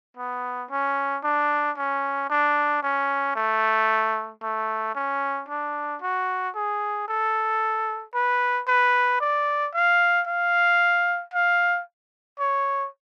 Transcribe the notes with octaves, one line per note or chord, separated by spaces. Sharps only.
B3
C#4
D4
C#4
D4
C#4
A3
A3
C#4
D4
F#4
G#4
A4
B4
B4
D5
F5
F5
F5
C#5